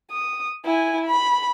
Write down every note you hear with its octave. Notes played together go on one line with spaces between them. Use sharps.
D#6
E4 G#5
B5